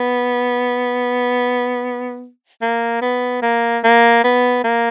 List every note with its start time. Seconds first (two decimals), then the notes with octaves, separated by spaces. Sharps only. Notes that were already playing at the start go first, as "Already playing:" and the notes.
Already playing: B3
2.62 A#3
3.01 B3
3.42 A#3
3.84 A#3
4.24 B3
4.64 A#3